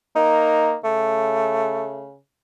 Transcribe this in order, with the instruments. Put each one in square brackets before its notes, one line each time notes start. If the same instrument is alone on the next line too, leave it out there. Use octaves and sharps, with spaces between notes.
[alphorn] A#3 [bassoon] D#4
[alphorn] C#3 [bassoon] A3